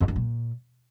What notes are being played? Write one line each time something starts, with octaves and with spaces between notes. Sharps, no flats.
E2
F#2
A#2